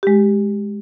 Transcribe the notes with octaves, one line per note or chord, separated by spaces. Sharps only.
G#3 G4